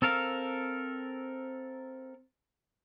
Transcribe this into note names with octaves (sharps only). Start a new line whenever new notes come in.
C4 A4 A#4 F5